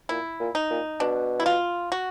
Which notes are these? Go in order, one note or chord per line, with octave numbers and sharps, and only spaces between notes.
A#2 E4
A#2
D#4
A#2
B2 D4
E4
F4
F#4